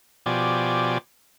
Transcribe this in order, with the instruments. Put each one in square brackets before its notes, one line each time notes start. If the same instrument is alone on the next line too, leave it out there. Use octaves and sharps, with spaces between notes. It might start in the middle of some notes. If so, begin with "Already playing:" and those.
[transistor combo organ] B2 F3 G4 D5 G#5